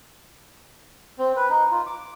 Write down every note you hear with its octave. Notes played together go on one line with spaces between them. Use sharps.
C4
B4
D#4
F4
D6